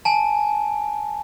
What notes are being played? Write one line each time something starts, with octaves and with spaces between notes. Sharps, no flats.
G#5 A5